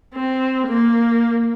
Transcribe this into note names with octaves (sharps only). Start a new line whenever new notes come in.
C4
A#3